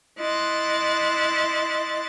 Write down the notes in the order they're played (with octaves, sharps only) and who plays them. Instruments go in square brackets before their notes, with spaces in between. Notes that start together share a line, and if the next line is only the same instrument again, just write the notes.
[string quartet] E4 D#5 C6 F#6 A6